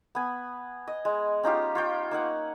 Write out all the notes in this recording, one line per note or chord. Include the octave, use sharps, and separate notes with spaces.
B3 G#5
D#5
G#3
C#4 D#4 F4 G4
F4 C#5 G5
A#3 D#4 F#5